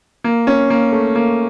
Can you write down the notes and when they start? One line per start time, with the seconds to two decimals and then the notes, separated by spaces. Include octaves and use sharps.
0.24 A#3
0.47 C#4
0.70 A#3
0.92 A3
1.15 A#3